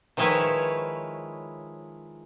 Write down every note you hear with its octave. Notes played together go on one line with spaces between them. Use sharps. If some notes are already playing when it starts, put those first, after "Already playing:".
D#3 F3 G#3 E4 B4 C#5